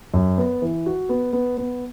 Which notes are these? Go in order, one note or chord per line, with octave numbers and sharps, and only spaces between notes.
F#2
B3
E3
F#4
B3
B3
B3